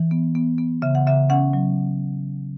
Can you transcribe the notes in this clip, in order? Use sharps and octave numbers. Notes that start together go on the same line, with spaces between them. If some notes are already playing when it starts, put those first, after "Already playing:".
Already playing: E3
B3
B3
B3
C#3 E5
F#5
C#3 E5
C#4 F#5
F#3